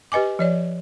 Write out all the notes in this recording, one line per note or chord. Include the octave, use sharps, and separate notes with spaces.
G4 B4 D#5 G#5 D6
F3 C#5 D5